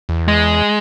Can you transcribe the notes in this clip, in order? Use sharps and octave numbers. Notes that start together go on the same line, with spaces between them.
E2
G#3